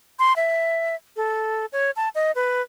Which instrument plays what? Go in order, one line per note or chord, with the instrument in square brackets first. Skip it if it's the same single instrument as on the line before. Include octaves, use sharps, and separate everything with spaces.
[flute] C6
E5
A4
C#5
A5
D#5
B4